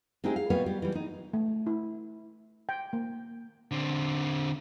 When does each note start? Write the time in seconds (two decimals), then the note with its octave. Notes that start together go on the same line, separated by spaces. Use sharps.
0.24 G#3 C4 D#4 E4 G4 G#4
0.36 F5
0.50 B2 G3 B3 B4 C#5 F5
0.66 G3
0.82 E3 G3
0.95 D#4
1.33 A3
1.67 E4
2.69 G5
2.93 A#3
3.71 D3 C4